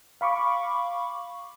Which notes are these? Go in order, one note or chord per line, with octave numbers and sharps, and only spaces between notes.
F5 B5 C#6 D6